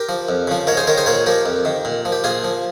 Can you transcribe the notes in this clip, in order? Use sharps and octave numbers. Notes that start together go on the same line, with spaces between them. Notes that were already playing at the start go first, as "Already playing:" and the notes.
Already playing: G4 A#4
F3
F2
C#3 F3
G#2 A#4 C#5
G#4 C5
D#3 A#4 C#5
G#4 C5
A#2 A#4 C#5
F3 G4 A#4
F2
D#3
A#2
F3
G4
A#2 F4 G#4
F3